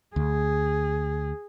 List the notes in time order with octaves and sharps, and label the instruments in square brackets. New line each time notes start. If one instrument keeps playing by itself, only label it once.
[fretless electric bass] D2 [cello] G#4